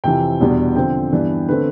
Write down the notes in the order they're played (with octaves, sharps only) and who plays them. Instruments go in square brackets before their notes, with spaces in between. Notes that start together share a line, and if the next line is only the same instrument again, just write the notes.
[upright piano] F2 C3 E3 G5
E2 B2 G3 B3 D4
D3 F3 C4 G5
G2 E3 B3 D4
D3 A3 C4 B4